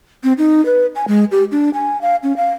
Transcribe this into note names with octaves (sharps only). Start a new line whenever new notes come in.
C4
D#4
B4
G#5
G#3
G4
D4
G#5
F5
C#4
F5